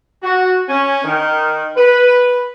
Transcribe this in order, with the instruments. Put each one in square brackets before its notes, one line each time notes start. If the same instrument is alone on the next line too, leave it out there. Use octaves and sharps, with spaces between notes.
[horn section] F#4
C#4
D#3
B4